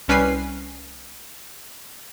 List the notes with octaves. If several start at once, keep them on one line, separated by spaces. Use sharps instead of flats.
C2 G3 C#4 B4 G#5 C7